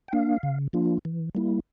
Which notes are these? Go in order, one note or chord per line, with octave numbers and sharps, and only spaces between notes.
G5
A#3 D4 F5
C#3
F3 A#3 D4 F4
E3
G3 A#3 E4